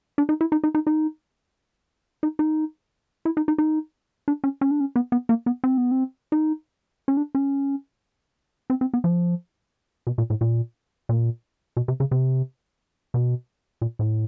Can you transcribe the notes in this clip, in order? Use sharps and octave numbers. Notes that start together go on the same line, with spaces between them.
D4
D#4
E4
D#4
D#4
D#4
D#4
D#4
D#4
E4
D#4
D#4
D#4
D4
C#4
C#4
D4
C#4
B3
B3
A#3
B3
C4
B3
C4
D#4
C#4
D4
C#4
C4
C4
B3
F3
B2
A#2
A2
A#2
A#2
B2
C3
C#3
C3
B2
A#2
A2